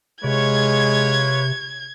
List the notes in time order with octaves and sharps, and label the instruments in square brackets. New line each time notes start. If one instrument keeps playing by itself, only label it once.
[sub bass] C3 [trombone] G#3 [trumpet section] F4 B4 C#5 [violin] G#6